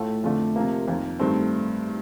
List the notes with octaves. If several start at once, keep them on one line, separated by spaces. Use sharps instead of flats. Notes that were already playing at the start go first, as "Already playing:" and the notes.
Already playing: A2 A3 F4 A4
F2 D3 A3 D4 F4
C3 F3 A#3
F2 D#3 A#3
G2 D#3 A3 C4